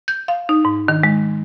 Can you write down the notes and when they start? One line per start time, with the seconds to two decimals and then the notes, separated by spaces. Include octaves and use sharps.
0.08 G6
0.28 F5
0.49 D#4
0.65 G#2
0.88 D#3
1.03 G#3